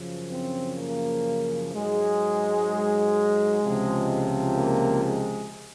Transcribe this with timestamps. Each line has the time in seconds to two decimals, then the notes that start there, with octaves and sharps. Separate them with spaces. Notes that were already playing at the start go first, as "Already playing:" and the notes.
Already playing: F#2 C#3 F3
0.32 C4
0.79 A#3
1.73 G#2 F#3 G#3
3.62 C#2 C3 F3
4.57 A#3
5.04 G#3